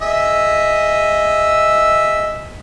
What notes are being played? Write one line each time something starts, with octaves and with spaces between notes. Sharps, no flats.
G#4 D#5 E5